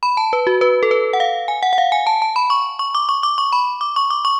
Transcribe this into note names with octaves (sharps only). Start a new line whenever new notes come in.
B5
A5
B4
F#4
B4
A4
B4
F#5
F5
G#5
F#5
F#5
F5
G#5
A5
A5
B5
C#6
C#6
D6
C#6
D6
C#6
B5
D6
C#6
D6
C#6